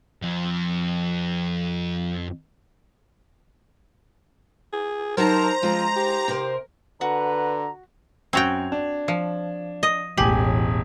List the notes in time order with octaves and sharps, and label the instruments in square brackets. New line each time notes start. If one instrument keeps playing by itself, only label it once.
[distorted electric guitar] F2 F3
[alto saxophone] G#4
[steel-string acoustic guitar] F#3 D#4 A5 [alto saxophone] A#4 [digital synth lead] C5 [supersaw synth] A#5
[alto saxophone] F3 [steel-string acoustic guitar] G#3
[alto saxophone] G4
[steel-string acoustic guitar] C3 A#4
[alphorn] D3 [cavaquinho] F#4 [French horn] B4 [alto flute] A#5
[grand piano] F#2 G#6 F7 [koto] C4 F#4 G5
[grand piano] D4
[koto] F3
D#5
[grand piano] E1 G#5 F#7 [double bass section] A1 [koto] G4